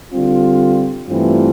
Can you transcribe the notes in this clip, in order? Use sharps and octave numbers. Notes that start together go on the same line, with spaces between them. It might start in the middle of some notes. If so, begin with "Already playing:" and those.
D3 G3 C4 F4
G2 E3 A3 C4 F4